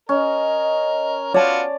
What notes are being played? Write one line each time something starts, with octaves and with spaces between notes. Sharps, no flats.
C#4 A#4 D#5
B3 F4 F#4 C#5 D5 A5